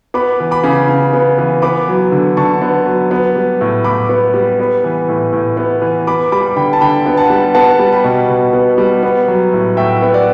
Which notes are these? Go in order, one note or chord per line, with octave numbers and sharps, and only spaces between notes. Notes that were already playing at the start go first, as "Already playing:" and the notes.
B3 B5 D6
E3
B5 D6
C#3
C#3
B3
E3
B3 B5 D6
F#3
D3
D3 A5 C#6
B3
F#3
B3
G3
A2
A2 B5 D6
B3
G3
B3
E3
A2
A2
B3
E3
B3 B5 D6
G3 B5 D6
D3 G5 B5
A5
D3 G5 B5
B3
F#5 A5
G3
B3 F#5 A5
G3
G5 B5
B2
B2
B3
G3
B3
F#3
A2
A2 E5 G5
B3
D5 F#5